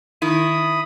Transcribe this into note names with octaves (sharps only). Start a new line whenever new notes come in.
D#3 E4 B5 D#6